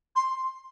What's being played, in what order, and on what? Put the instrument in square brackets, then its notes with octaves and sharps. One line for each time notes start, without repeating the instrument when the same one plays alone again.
[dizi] C6